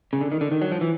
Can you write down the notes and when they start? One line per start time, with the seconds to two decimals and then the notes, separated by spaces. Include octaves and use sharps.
0.13 C#3
0.21 D3
0.32 D#3
0.41 D3
0.52 D#3
0.62 F#3
0.72 F3
0.81 E3